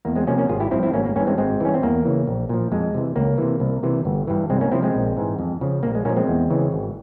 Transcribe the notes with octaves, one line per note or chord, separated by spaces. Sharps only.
E2 A#3
G#3 C4
C3 F3 A#3 C#4
A#3 C#4
G#1 F4 G#4
E4 G4
G2 F3 C4 E4
C4 E4
G#1 A#3 C#4
A#3
G2 E3 A#3 C#4
G#3 C4
G#1 G#3 C4
G2 E3 C#4
C4
E2 A#3
C#3 E3
A#1
A#2 F3
F2 G#3
C3 E3
C#2 A#3
C3 E3
C2
C3 E3
G1
G2 E3
C2 G#3 C4
A#3 C#4
C3 F3 C4 E4
G#3 C4
A#1
G#2 E3
F2
C#3 F3
A#1 A#3
G#3
A#2 F3 A#3 C#4
G#3 C4
E2
C#3 E3
G#1